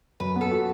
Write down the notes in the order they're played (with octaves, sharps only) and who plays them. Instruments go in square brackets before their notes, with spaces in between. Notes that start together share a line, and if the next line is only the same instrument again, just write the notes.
[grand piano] F#2 [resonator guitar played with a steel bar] B4
[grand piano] B3 [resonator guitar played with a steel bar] A4
[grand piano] F#4